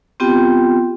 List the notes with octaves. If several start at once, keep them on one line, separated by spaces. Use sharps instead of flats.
B3 C4 F4 G4 G5